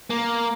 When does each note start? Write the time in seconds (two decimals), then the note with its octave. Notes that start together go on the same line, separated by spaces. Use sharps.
0.10 A#3